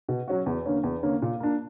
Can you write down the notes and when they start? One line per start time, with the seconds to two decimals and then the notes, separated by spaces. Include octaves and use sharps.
0.09 B2
0.28 F#3 C#4 F#4
0.46 E2
0.66 D3 A#3 C#4
0.83 E2
1.03 D3 A#3 C#4
1.22 A#2
1.40 A#3 D4